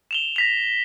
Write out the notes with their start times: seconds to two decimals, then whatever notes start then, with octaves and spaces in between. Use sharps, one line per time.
0.11 E7 F7 G7
0.36 A#6 B6 F7